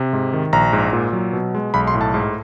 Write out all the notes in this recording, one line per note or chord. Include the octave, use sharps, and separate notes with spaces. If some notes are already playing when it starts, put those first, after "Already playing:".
Already playing: C3
G#2
D#3
A#1 A#5
G#2
A#2
F#3
B2
G#3
B1 B5
C6
A2
A5
G#2